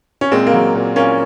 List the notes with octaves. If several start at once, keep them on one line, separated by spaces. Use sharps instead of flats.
C#4
A#2 G#3 C4
A#3
F#3
A#2
A#2 A#3 C#4